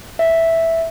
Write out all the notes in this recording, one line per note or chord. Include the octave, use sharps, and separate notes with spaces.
E5